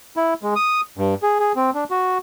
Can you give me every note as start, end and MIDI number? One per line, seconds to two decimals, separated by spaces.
0.16 0.34 64
0.43 0.54 56
0.56 0.81 87
0.97 1.14 43
1.23 1.39 68
1.40 1.52 68
1.56 1.70 60
1.74 1.84 62
1.91 2.18 66